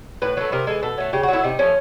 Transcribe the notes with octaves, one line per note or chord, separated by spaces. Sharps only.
A2 B4
F#3 A3 B4
C3 A#4
E3 G#3 A4
B2 A4
F#3 A3
C#3 G4
F#4
F#3 A3 E4
C3 D#4
F3 A3 C#4